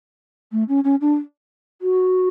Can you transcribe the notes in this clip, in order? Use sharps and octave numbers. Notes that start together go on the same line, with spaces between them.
A3
C#4
C#4
D4
F#4